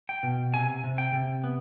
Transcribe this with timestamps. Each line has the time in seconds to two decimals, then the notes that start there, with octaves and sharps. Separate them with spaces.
0.09 G5
0.23 B2
0.54 C3 G#5
0.84 C3
0.98 G5
1.13 C3
1.44 B3